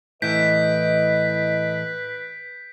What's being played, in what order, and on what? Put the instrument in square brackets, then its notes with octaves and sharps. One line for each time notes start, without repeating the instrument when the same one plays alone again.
[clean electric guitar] A2 E3 [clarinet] B4 [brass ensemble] D#5 [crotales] G6 B6 D7